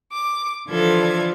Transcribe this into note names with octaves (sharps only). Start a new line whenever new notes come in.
D6
D3 E3 F3 F4 A4 G#6